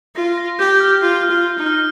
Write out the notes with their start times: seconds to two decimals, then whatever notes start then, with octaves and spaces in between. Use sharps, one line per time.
0.15 F4 A#6
0.38 A#6
0.59 G4 G6
0.80 F6
1.01 F4 F6
1.23 F6
1.30 F4
1.58 D#4
1.66 F6